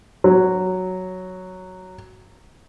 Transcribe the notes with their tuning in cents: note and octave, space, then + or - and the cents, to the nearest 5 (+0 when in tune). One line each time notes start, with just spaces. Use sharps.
F#3 +0